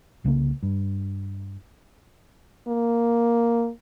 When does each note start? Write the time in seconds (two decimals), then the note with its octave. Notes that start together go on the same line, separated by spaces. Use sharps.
0.24 C2 C#3 E3 A#3
0.63 G2
2.68 A#3